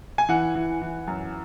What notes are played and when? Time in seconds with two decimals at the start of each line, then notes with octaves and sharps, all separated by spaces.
0.18 G#5
0.29 E3 F#5
0.55 E3
0.82 E3
1.07 F#2